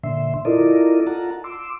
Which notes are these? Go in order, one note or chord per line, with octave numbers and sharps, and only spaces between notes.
A#2 D3 E5 C6
E4 F4 A4 A#4 D5 D#5
F4 F#5 A5 A#5
C6 D6 E6